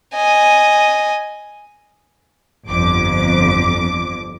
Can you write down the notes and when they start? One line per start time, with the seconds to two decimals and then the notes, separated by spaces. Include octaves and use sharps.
0.15 D#5 G#5
2.67 G1 F2 D6